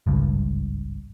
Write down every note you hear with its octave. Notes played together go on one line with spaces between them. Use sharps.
G#1 C#2 G2